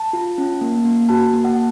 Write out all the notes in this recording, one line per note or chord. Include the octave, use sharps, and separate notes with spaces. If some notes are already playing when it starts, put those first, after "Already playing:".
Already playing: A5
F4
C#4
A#3
A#3
F#4 A5
A#3
F#5